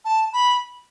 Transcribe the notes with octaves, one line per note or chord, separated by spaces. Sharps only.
A5
B5